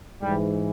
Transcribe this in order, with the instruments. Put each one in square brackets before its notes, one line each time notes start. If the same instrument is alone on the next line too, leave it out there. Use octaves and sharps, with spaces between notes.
[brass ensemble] G#2 E3 G3